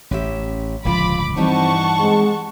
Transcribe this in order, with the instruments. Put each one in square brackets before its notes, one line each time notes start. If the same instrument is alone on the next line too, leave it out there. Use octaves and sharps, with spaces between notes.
[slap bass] A1 [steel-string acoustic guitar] C#4 G4 E5
[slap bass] D1 G1 C#2 [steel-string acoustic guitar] F3 F4 [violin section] B5 D6
[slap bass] G2 [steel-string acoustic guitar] E3 G3 D#4 [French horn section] C4 [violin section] F#5 A5 C#6
[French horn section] G#3 C4